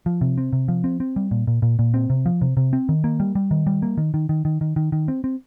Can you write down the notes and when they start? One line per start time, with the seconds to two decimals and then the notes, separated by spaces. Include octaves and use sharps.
0.06 F3
0.21 C3
0.38 C4
0.53 C3
0.68 F3
0.84 C4
1.00 C4
1.16 G3
1.31 A#2
1.47 A#2
1.62 A#2
1.79 A#2
1.94 C4
2.10 C3
2.26 F3
2.41 C3
2.57 C3
2.73 C4
2.89 D#3
3.04 A#3
3.20 G3
3.35 G3
3.51 D#3
3.67 G3
3.82 A#3
3.98 D#3
4.14 D#3
4.29 D#3
4.45 D#3
4.61 D#3
4.76 D#3
4.92 D#3
5.08 C4
5.24 C4